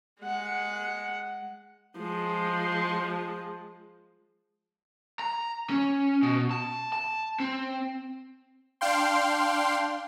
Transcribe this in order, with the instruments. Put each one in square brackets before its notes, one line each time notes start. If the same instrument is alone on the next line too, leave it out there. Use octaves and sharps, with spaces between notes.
[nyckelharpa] G#3 F#5
[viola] F3 G#3
[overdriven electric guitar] A#5
C#4
B2
A5
A5
C4
[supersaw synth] D4 F5 G5 C6